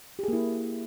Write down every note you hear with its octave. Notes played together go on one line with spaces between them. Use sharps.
A#3 E4 G4 G#4